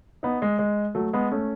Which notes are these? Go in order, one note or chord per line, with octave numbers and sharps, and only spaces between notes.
B3 D#4
G#3
G#3
F#3 A3
G#3 B3
A3 C#4